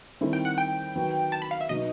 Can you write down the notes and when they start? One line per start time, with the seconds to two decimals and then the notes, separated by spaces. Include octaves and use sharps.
0.21 D#3 G3 C4 E4 A4
0.33 G5
0.45 F#5
0.58 G5
0.95 D#3 F#3 B3
1.32 A5
1.42 B5
1.51 F5
1.61 E5
1.69 B2 F#3 B3 D#4 D#5